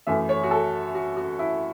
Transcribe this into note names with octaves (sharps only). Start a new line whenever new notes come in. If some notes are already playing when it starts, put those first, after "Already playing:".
F#2 E3 A3 E5
C#5
F#4
A4
F#4
F#4
E4